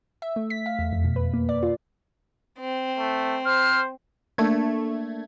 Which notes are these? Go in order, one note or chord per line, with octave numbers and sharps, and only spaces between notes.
E5
A3
B6
F5
E2
F2
B2
B4
A#3
D5
F4
C4
A3
C5 F6
A3 A#3 D4 G#6